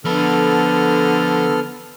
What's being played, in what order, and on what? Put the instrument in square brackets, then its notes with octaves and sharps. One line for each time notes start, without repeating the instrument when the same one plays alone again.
[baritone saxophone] D3 [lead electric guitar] F3 B5 [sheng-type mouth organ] B3 A4 F6